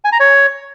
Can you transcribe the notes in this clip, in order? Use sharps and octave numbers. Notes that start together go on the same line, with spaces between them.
G#5
A#5
C#5